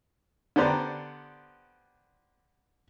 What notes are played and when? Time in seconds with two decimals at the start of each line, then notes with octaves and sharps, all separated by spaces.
0.56 D3 B3 G4 C5 D5 A#5